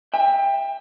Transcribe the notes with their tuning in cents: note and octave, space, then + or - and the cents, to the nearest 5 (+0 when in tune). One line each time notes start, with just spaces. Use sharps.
E5 +0 G5 +25